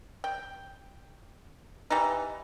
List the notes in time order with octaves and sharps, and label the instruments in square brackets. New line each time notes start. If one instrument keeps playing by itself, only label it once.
[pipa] G5
E3 G3 D#4